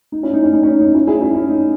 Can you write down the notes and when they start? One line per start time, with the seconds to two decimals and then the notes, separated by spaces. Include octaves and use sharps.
0.12 D#4
0.23 C#4 E4
0.33 D#4
0.43 C#4
0.53 D#4
0.63 C#4
0.68 D#4
0.80 D#4
0.94 C#4 E4
1.07 E4 G#4
1.21 C#4 E4
1.35 C#4
1.49 D#4